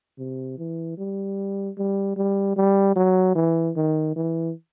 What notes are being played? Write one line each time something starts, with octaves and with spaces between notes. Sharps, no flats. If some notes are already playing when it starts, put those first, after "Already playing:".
C3
E3
G3
G3
G3
G3
F#3
E3
D#3
E3